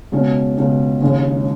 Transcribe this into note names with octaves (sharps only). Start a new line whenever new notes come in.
C#2 B2 G#3 C#4
C#2 B2 G#3 C#4
E1 D#2 C#3 G#3 C#4